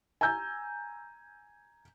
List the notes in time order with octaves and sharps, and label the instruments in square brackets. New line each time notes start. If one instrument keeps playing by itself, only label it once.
[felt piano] G#5 A#5 E6 G6